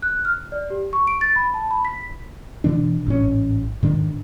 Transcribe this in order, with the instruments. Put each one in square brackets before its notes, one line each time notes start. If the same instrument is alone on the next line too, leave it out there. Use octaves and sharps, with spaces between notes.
[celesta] F#6
F6
D5
G4
C#6
D7
A6
B5
A5
B5
B6
[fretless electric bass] B2 E3 D4
A1 G#2 C#4
G#2 D#3 D4